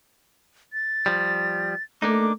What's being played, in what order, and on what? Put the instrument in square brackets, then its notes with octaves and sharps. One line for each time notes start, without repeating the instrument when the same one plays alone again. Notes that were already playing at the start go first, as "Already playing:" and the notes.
[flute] A6
[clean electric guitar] F3 G3
[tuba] A3 [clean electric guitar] A#3 D4 D#4 [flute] D6